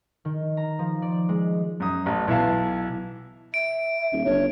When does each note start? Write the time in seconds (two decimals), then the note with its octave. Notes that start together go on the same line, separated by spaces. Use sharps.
0.25 D#3
0.57 A#5
0.79 F3
1.02 D5
1.29 G#3
1.80 F#2 D#6
2.06 A1
2.28 B1 E3 E5 F5 A5
3.54 E5 D7
4.13 D#1
4.25 G1 C#5